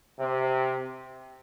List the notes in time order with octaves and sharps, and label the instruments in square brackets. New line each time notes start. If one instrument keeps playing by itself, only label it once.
[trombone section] C3